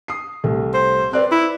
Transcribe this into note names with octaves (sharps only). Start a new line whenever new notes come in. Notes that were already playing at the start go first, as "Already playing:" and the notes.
D#6 C7
C2 A3
C5
C4 B4 D5 F#6
E4